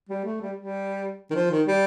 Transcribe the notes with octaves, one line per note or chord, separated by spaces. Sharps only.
G3
A3
G3
G3
D#3
F3
D#3
G3